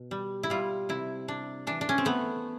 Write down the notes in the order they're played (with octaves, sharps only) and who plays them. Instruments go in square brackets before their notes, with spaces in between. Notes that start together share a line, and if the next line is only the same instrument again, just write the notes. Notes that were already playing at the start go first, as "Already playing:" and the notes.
Already playing: [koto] B2
G3
E4
G3 F4
C3 E4
C3 D4
E3 D4
D4
C#4
C4
A3 B3